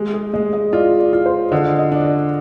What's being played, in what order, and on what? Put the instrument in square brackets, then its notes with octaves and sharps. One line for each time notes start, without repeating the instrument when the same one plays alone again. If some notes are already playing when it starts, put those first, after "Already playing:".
Already playing: [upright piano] G#3 [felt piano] G4
[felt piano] G#4
[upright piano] G#3 [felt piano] D#5
[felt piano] D#5
[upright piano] F4 [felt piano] D5
[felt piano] D5
[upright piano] F4
[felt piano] C5
[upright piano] D3 [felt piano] D#5
[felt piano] D#5
[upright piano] D4
[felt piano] D5